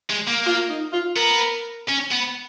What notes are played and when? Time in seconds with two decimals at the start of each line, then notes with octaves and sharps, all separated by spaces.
0.10 G#3
0.27 A#3
0.46 F4
0.69 D#4
0.93 F4
1.17 B3 A#4
1.89 C#4
2.12 B3